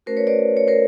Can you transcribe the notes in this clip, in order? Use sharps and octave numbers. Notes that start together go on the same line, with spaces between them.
A3 C#4 F#4 A#4 C5
B4 C#5
C5 D5
C#5
A#4 C5